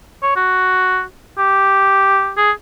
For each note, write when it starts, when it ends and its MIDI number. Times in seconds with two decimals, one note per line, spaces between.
0.23 0.32 73
0.36 1.02 66
1.38 2.32 67
2.37 2.51 68